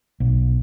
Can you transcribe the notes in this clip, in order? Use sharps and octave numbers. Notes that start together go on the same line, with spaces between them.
B1